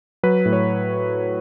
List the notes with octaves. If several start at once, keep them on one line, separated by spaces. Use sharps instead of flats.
F#3 B4
A2
C#5